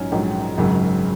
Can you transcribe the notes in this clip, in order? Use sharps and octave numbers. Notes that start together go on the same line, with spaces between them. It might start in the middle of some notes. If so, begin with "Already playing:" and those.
Already playing: A#1 G#2 F#3 C#4 D#4
A#1 G#2 F#3 D#4
G#1 F#2 C#3 F#3